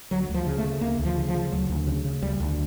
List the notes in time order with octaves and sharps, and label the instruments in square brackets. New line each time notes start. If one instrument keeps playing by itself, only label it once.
[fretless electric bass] D2 F#3
D2
F3
C#3
A3
C#3
D2 A#3
D2
F3
C#3
F3
C#3
D2 F#3
D2
C#3
C#3
D2 G3
D2